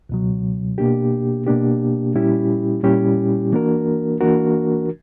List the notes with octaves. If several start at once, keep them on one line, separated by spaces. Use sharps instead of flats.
C#2 B2 F#3
B2 A#3 D4 G4
B2 A#3 D4 G4
A#2 G3 C#4 E4 G4
A#2 G3 C#4 E4 G4
E3 A#3 D4 F#4 A#4
E3 A#3 D4 F#4 A#4